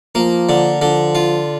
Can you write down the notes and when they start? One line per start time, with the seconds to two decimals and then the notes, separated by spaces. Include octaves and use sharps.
0.15 F3 A#3
0.49 D3
0.81 D3 F3
1.15 F4